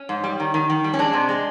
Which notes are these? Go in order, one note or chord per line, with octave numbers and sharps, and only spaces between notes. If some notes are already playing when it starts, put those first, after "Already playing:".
Already playing: C#4
G#2
G3
D#3
D#3
D#3
G3
C#4
G#3 D4
C3
G#3